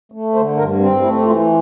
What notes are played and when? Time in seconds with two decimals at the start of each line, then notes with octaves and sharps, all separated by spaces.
0.12 A3
0.34 D3 C5
0.57 G2 A#4
0.79 C4
1.02 A3 E4
1.20 G4
1.24 E3 F4